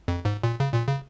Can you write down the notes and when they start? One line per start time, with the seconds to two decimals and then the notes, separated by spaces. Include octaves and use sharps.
0.08 F2
0.25 G#2
0.43 A#2
0.60 C#3
0.74 A#2
0.87 C#3